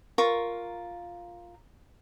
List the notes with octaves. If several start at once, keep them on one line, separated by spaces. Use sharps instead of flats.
F4 A#4 C#6